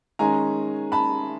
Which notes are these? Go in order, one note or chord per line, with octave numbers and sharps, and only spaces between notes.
D#3 G#3 C#4 G#5 A#5
A5 B5